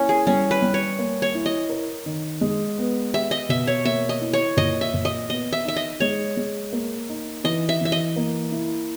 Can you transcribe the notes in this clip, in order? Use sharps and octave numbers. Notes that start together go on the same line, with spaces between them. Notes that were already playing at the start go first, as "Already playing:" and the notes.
Already playing: A#3 C#4 E4
G#4
G3 C#4
B4
G3
C#5
A#3
C#5
E4
D#5
A#4
D#3
G#3
B3
G4 E5
D#5
B2 E5
C#5
A#3 E5
D#5
E4
C#5
A#2 D#5
E5
A#2
D#5
B3 D#5
E5
D#4 E5
D#5
G#3 C#5
G#3
A#3
D#4
E3 D#5
E5
E3 E5
D#5
A#3
E4